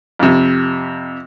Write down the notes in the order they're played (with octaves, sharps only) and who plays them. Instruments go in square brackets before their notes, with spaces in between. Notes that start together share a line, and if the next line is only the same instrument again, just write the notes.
[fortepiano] F2 C3